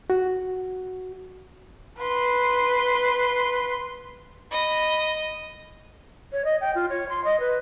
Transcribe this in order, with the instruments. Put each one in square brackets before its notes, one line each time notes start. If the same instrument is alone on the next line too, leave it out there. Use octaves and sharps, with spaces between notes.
[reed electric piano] F#4
[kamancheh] B4 C6
[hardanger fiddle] D#5 [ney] B5
[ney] C#5
D#5
G5
F4
C#5
C6
D#5
B4